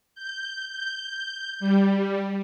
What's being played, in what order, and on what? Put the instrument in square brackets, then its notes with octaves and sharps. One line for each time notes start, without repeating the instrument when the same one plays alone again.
[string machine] G6
G6
G3